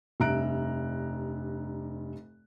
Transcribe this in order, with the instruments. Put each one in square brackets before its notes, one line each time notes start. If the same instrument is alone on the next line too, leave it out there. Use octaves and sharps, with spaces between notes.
[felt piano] F1 G2 E5 A#5 F#6 D7